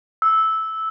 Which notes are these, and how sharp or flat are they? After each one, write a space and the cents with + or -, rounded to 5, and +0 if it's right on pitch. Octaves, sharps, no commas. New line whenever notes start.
E6 -10